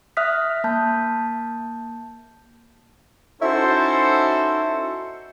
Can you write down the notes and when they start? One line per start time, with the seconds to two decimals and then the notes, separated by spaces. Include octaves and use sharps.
0.17 E5 D#6 F6 F#6 B6
0.64 A#3 A5 G6
3.42 C#4 D#4 E4 F#4 A4 C5